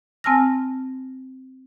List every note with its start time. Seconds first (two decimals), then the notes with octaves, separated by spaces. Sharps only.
0.24 C4 G#5 A5 E6 F6 A#6